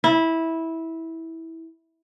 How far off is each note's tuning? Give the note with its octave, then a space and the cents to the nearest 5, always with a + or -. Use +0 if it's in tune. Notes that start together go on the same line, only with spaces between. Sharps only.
E4 -15